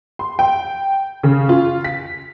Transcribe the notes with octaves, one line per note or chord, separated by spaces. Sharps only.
C6
G5
C#3
F4
B6